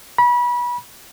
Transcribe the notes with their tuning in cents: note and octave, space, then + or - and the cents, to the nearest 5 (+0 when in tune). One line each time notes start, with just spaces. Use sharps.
B5 -30